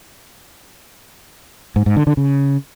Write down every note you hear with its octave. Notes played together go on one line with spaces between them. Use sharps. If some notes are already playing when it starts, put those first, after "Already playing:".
G#2
G#2
D3
D3
C#3